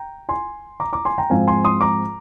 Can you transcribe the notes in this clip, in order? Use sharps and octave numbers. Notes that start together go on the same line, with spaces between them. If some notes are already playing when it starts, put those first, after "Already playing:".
Already playing: G5 A#5
G#5 C6
A#5 D6
A#5 D6
G#5 C6
G5 A#5
G#2 F3 C4 F5 G#5
G#5 C6
C6 D#6
A#5 D6